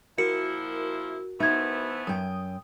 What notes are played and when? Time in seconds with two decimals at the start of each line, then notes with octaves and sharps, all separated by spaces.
0.18 A#2 F3 E4 F#4 A#4 C#7
1.40 E3 A3 B3 D#4 C5 E5 G#6
2.07 F#2 G5 D#6